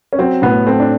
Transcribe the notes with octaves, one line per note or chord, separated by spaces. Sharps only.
C#4
F#3 C4
A2 B3
A3 C4
D4